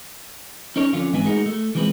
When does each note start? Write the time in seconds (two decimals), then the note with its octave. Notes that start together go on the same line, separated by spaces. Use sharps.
0.76 C#4 D#4 A#4 C#5
0.93 F2 D3 C#4 F4
1.13 G#2 E3 C4 B4 D#5 G#5
1.24 A2 G#3 D#4 F#4 A#4
1.46 A3
1.75 E3 F3 G#3 C4 B4